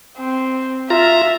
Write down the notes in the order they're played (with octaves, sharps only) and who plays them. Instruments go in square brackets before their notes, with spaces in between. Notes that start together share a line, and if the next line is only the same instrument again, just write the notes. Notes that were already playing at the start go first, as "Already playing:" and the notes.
[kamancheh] C4
[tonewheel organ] F4 A#5 [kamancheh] E5